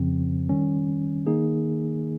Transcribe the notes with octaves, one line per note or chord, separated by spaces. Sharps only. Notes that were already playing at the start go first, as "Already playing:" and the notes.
Already playing: F2 C#3 F3 C4
D#3 G3 C#4
D#3 A#3 D#4 G#4